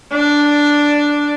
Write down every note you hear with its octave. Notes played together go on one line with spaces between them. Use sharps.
D4